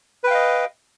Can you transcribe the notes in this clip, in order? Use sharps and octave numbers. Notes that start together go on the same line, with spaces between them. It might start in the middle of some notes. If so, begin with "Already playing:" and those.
B4 D#5 F5 G5